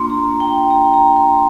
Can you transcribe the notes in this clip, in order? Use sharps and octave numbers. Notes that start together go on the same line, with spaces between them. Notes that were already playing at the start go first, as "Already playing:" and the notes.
Already playing: A#3 D4 F4 C6
A#5
G5
A#5
A#5
C6